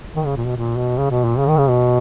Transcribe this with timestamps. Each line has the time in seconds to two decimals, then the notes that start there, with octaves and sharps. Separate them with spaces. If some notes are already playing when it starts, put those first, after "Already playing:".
0.16 D#3
0.26 C#3
0.37 A#2
0.47 B2
0.57 A#2
0.77 B2
0.98 C#3
1.11 B2
1.25 A#2
1.38 C#3
1.48 D#3
1.58 C#3
1.69 B2